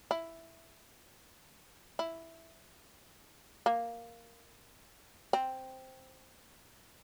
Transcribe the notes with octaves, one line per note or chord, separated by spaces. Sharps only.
E4
E4
A#3
C4